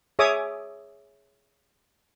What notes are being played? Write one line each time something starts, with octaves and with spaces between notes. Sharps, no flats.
G#4 C#5 E5 D6 D#6